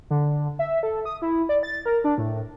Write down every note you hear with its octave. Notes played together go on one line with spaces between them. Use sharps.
D3
E5
A4
D#6
E4
D5
A6
A#4
D4
A2